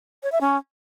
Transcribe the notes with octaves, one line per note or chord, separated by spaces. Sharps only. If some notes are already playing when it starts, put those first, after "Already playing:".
C#5
E5
C#4